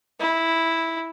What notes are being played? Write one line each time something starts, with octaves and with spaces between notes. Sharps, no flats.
E4